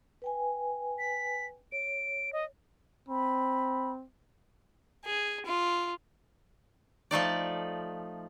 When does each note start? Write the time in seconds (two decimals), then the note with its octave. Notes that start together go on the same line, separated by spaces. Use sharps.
0.22 B4 G5 G#5
0.99 B6
1.72 C#5 D7
2.33 D#5
3.09 C4 B5
5.05 G#4
5.46 F4
7.11 F3 A3 D#4 D5